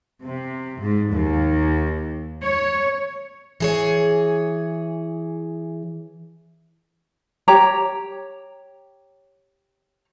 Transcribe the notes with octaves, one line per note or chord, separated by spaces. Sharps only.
C3
G#2
D#2
C#5
E3 G#4 C#5
G4 C#5 A#5